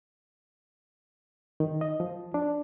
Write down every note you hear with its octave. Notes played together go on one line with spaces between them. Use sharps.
D#3
D#5
F3
D4